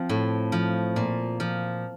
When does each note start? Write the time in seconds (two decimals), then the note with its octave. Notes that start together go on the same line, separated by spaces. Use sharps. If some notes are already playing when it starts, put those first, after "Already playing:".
Already playing: F3 C4
0.09 A2
0.52 F3
0.96 A#2
1.40 F3